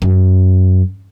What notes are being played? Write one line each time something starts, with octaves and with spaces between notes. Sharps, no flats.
F#2